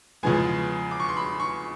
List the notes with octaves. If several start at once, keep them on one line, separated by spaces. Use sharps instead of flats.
E2 C#3 F3 G#3 B3 G#5
D6
C#6
C6
B5
C#6